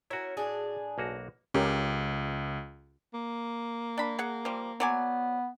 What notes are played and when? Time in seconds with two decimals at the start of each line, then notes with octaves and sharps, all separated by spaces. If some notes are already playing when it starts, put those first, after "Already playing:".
0.10 C#4 E4 F#4 A#4 C#5
0.37 A2 D4 G#4
0.98 B1 A#3 F#4
1.54 C#2 C#4 G4 A#4
3.14 A#3
3.98 D4 B5
4.19 G#4 F#5
4.45 F3 G3
4.80 F#3 B3 D5 G#5